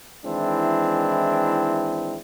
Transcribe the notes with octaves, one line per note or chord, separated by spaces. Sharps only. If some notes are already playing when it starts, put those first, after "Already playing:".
D#3 E3 G#3 C4 D4 E4